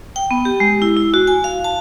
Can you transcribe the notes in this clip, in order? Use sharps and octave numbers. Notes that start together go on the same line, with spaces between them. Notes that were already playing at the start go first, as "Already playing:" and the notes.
G5
B3
G4
G#3
E4
E4
F#4
G#5
F5
A5